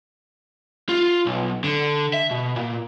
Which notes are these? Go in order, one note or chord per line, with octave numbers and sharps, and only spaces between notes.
F4
B1
D3
E5
B2
A#2